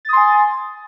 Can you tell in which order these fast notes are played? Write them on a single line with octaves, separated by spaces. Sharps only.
A6 D#6 C6 G#5